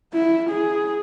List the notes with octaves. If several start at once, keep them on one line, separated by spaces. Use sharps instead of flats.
E4
G#4